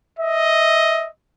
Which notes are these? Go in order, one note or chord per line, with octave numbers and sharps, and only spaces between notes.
D#5 E5